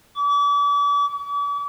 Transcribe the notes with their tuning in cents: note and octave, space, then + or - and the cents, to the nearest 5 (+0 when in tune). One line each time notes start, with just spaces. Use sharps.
D6 -40
D6 -45